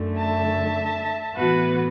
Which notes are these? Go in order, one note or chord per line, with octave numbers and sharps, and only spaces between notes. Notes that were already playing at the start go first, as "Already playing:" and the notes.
Already playing: F#2 D3 A3
E5 A5
A2 E3 B3 F#4 B4